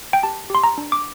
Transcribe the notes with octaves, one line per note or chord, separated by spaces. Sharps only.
G5
G4 A5
G4 C6
A#5
D4
D6